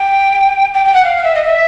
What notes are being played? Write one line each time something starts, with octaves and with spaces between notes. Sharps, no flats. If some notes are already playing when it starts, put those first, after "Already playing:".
Already playing: G5
G5
G5
F#5
F5
F5
E5
D#5
E5